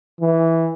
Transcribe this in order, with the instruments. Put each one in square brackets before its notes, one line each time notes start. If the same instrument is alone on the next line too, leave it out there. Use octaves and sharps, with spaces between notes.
[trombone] E3